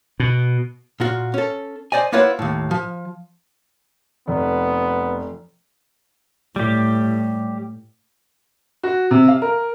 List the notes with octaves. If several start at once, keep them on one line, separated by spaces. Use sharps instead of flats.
B2
A#2 F4 F#4
C#4 A4
C5 D5 D#5 G#5
A#3 E4 F4 B4 C#5 F#5
D#2 A2
F3
F1 B3
A2 G3 G4
F#4
C3
F5
A#4